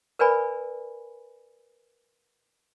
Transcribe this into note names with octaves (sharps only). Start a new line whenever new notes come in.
A#4 B4 D5 G#5 B5